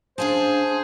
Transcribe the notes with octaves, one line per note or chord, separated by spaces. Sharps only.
D4 G#4 C5 F5 A5